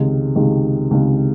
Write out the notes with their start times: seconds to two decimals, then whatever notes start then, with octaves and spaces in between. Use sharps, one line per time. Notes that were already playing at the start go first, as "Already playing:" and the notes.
Already playing: C#2 C3 D#3 G#3
0.36 C#2 C3 D#3 G#3
0.91 C#2 C3 D#3 G#3